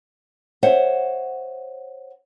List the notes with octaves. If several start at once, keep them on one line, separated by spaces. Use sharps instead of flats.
C5 C#5 E5 F#5